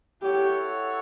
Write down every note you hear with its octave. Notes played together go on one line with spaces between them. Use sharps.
E4 G4 A4 C#5 F#5